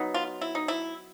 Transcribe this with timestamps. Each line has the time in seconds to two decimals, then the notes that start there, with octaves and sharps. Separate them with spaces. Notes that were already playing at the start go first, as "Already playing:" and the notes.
Already playing: F#3 B3 D#4
0.14 F4
0.41 E4
0.55 D#4
0.68 E4